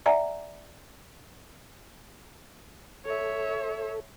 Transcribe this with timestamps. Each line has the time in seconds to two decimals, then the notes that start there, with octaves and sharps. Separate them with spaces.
0.06 D5 E5 F#5 G#5 A#5
3.05 A4 C#5 E5